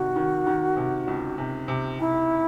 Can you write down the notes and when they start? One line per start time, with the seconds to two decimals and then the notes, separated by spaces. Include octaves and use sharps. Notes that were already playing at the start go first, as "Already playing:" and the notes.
Already playing: C3 D#3 F#4
0.16 D#3
0.46 D#3
0.77 C3
1.07 C#2
1.38 C3
1.68 C3
1.99 C3 E4